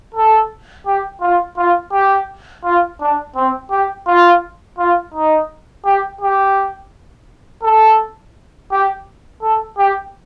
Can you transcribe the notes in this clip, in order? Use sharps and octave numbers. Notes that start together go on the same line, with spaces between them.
A4
G4
F4
F4
G4
F4
D4
C4
G4
F4
F4
D#4
G4
G4
A4
G4
A4
G4